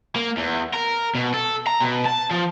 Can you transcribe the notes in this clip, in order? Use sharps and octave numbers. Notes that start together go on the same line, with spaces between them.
A#3
E2
A#4
B2
A4
A#5
B2
A5
F3